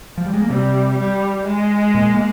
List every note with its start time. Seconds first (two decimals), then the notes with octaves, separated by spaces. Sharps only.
0.18 F3
0.26 G3
0.34 G#3
0.42 A#3
0.50 C3 G3 C4
0.98 G3
1.46 G#3
1.95 A#2 A#3
2.14 A#3